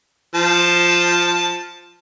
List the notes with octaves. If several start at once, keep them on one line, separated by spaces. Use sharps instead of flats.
F3 A5